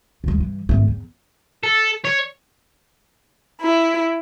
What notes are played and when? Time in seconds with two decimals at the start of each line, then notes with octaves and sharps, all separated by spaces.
0.24 D#2 G#3
0.38 G2 E3
0.69 G#1 A3
0.88 E2
1.64 A4
2.05 C#5
3.60 E4